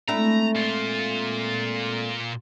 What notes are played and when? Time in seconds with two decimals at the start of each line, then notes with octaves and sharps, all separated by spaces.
0.08 G#3 A3 C4 D4 E4 A4 A#5
0.56 A#2 F4